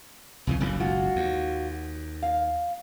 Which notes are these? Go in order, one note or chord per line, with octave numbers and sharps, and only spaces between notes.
C2 F2 C#3 E3
F#1 B1 C#3 E3
G#3 F4 F#4
D#2
F5